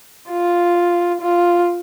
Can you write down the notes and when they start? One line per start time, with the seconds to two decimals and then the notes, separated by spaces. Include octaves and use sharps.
0.30 F4
1.21 F4